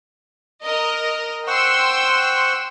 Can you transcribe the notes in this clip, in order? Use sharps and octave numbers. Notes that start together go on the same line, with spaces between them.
A#4 D#5
C5 F#5 G5 C6 C#6 E6